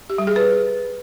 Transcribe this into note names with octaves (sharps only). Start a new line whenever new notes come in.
G4
G3
G#4
B4